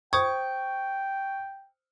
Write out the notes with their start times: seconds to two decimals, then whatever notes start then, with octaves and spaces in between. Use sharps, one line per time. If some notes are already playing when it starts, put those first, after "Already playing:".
0.13 C5 G5 C#6 D#6 G#6